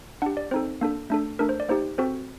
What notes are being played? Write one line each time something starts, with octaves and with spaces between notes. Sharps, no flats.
D4 G4 F#5
D5
C4 D#4 A4 C5
A#3 D4 A4
A3 D4 A4
A3 D4 A4 A#4
C5
D5
A#3 D#4 G4 C5
C4 F#4 A4 C5